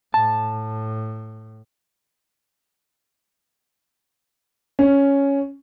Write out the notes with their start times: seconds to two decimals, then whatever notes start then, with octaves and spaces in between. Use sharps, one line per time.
0.14 A2 A5
4.79 C#4